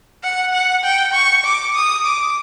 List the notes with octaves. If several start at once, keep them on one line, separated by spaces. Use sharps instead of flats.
F#5
F#5
G5
C#6
D6
D#6
D6